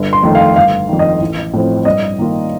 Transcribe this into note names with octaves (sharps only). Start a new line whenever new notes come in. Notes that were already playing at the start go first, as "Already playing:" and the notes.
Already playing: G1
C6
F2 D#3 A3
F5
G1 F5
F2 D#3
D#5
A1
A2 F3 C4
G2 D#5
D#3 A#3 F4